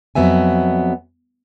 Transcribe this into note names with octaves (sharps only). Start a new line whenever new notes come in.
F2 F#3 B3 E5 G#5